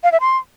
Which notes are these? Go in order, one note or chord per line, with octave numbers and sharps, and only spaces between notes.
F5
E5
C6